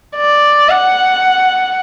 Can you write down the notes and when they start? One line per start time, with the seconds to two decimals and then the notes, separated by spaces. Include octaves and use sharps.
0.16 D5
0.69 F#5